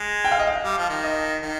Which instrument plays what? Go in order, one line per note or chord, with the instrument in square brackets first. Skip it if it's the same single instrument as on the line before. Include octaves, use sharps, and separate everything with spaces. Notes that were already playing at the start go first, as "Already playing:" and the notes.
Already playing: [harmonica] G#3
[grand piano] G5
F5
D#5
F5
[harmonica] G3
F3
D#3
[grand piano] D#5
[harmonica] D#3